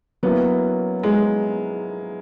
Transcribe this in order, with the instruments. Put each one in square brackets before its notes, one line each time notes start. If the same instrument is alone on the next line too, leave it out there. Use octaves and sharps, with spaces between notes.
[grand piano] F#3 A#3 C#4 E4 [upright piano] B3
[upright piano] G#3